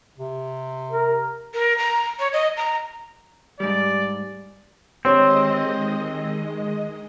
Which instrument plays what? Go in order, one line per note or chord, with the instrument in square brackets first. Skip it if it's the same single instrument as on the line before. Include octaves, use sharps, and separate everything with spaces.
[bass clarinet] C3
[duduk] A#4
[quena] A#4
A#5
C#5
D#5
A#5
[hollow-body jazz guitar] G#2 G3 [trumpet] D5
[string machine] D#3 G#3 D#5 [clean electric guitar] C4 [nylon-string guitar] D4 G4 C#5